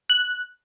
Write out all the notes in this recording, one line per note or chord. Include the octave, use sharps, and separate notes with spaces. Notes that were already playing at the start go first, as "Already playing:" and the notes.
F#6